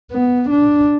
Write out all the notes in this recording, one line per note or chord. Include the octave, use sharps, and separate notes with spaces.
B3
D4